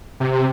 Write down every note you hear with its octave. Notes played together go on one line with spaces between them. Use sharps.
C3